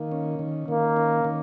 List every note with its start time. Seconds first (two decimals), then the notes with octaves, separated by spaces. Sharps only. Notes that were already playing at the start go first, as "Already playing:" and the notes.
Already playing: D#3 A#3
0.12 C#4
0.39 D#3
0.68 D#3 A#3
0.97 C#4
1.24 D#3